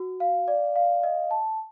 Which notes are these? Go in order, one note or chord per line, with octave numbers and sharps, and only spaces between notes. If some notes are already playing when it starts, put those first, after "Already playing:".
Already playing: F#4
F5
D5
F5
D#5
A5